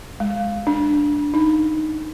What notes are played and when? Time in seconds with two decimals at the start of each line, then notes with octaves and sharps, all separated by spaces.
0.20 G#3
0.67 D4
1.34 D#4